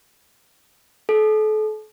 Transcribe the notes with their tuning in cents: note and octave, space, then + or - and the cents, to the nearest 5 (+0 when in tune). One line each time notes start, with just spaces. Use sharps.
A4 -35